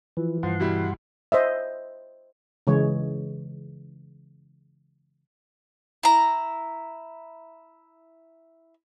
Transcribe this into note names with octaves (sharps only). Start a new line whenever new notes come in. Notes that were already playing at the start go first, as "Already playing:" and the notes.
E3 F3
G2 F3 F#5 C6
B2 G3 E4
C5 D#5 E5
C#3 E3 G#3 C#5
E4 A#5